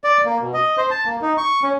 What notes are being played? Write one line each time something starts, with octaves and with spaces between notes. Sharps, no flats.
D5
A#3
B2
D#5
C5
A5
A#3
D#4
C#6
C#4